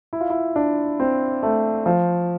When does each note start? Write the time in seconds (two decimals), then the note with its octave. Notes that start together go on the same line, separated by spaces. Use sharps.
0.13 E4
0.21 F4
0.30 E4
0.56 D4
1.00 C4
1.43 A3
1.86 F3